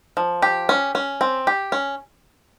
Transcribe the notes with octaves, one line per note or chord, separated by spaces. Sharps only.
F3
G4
C#4
C#4
C4
G4
C#4